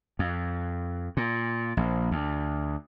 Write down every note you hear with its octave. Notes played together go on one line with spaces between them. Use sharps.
F2
A#2
A#1
D2